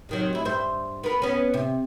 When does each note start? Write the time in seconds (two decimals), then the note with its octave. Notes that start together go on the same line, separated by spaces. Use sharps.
0.09 C3 D#3 F#3
0.33 D2 E4
0.45 G2 C5 E5
1.04 B3 A#4
1.22 B3 C#4
1.54 C3